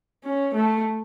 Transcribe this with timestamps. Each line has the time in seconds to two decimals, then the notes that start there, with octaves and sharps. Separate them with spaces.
0.24 C#4
0.55 A3